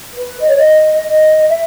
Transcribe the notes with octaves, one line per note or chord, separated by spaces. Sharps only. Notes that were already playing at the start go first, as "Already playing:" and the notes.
B4
D#5
C#5
D#5
D#5
D#5
E5